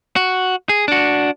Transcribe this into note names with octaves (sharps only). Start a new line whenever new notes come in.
F#4
G#4
D4 F#4